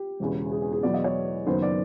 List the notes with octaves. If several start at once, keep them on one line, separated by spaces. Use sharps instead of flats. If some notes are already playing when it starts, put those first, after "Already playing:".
Already playing: G4
E1 E2 C#3
G#4
G#4
G#4
E2 B2 F#3 B3 D5
D#5
C#5
F#1 F#2 D#3 F#3 B3 C5
D5